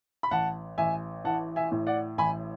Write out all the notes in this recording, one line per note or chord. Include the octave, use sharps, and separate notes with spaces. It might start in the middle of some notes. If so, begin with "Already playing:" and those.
B5
A1 F#5 A5
A1 E5 G#5
E3 F#5 A5
E5 G#5
A2
D5 F#5
A1 G#5 B5